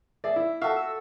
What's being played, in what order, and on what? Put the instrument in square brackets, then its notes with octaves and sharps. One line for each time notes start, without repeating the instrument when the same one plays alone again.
[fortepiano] G#4 D5 [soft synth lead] E5
[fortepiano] E4
[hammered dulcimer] F#4 A4 [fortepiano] E5 F5
[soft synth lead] E6